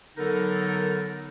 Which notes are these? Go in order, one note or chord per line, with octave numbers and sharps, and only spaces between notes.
D3 F#3 B3 D#4 A4 A#4